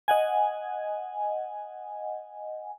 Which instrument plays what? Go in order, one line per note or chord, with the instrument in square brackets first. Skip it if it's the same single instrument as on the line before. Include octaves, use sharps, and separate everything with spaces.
[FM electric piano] D#5 F#5 G#5